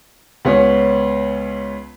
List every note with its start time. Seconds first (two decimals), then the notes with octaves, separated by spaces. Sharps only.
0.45 C#2 B3 C#4